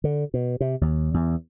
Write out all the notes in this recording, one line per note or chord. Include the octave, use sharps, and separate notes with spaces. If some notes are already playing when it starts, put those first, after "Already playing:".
D3
B2
C3
D#2
E2